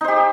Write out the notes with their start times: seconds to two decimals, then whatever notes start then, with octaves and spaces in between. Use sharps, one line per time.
0.01 D#4
0.04 C5
0.08 G4